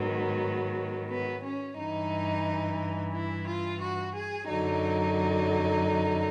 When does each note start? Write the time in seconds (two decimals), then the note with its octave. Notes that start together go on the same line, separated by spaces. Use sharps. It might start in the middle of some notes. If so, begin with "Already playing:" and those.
Already playing: G#2 D#3 F#3 B3
1.10 B3
1.43 C#4
1.78 G2 E3 D#4
3.13 E4
3.47 F4
3.81 F#4
4.15 G#4
4.48 F#2 D3 F#3 D#4